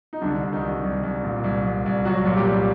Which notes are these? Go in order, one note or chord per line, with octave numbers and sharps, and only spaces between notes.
D#4
C2 D3 D4
C2
D#3 D#4
C2
C2
C2
A#2
C2
C2
C2
C2 F#3 F#4
A#2
G3 G4
C2